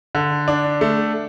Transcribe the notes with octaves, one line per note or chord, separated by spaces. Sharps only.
D3
D4
A3